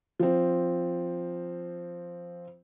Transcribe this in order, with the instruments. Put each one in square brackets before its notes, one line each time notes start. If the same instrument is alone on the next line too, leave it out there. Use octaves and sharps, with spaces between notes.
[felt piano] F3 C4